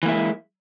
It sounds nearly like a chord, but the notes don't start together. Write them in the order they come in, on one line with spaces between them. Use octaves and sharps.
E3 A#3 E4 G#3